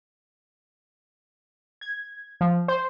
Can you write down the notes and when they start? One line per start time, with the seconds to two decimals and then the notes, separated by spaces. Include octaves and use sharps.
1.81 G#6
2.41 F3
2.68 C5